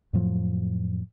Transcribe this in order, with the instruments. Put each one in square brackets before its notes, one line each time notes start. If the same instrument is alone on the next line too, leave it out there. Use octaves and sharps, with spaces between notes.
[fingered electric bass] F2 A2 F3 F#3